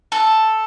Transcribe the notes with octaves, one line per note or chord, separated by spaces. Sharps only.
A4